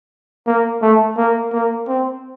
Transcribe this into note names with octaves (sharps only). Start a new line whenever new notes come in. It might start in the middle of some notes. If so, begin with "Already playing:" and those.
A#3
A3
A#3
A#3
C4